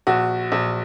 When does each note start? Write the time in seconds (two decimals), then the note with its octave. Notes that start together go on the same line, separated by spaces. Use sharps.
0.07 A#1 F#4
0.52 A#1